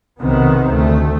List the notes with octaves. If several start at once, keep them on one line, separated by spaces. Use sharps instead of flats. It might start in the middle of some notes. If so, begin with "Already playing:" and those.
B1 C3 D#3 B3
D2 A3